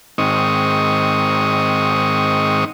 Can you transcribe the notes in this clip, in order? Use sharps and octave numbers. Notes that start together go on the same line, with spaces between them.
G#2 D#3 C4 C#6 D#6